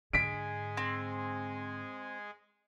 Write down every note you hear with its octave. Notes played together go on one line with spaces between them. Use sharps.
G#2 D3 G#3 G#4 B6 D7
C4